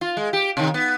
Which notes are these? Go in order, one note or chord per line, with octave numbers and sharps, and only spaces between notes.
F4
G#3
G4
C3 D#3
B3